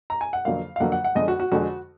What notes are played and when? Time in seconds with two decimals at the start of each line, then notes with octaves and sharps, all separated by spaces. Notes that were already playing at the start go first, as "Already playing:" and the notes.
0.10 A#5
0.21 G#5
0.33 F#5
0.45 F2 D3 F#3 A#3 F5
0.76 F5
0.80 F2 D3 F#3 A#3 F#5
0.92 F#5
1.04 F#5
1.15 F2 D3 G#3 D#5
1.28 F#4
1.40 F#4
1.52 F2 D3 G#3 F#4